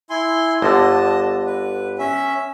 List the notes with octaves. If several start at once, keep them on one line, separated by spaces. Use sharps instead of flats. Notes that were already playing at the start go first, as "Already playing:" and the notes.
E4 G#5 C6
G1 D3 D#5 A5
B4
C#4 E5